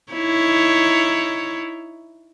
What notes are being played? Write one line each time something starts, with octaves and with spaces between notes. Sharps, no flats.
D#4 E4 C#5